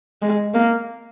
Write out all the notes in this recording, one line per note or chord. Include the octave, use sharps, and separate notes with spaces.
G#3
A#3